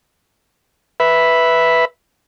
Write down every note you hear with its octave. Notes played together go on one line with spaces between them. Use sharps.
B4 E5 B5